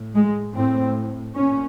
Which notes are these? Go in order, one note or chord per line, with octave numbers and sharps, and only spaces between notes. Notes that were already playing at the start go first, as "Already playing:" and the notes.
Already playing: A2
G#3
A2 C4
A#2 C#4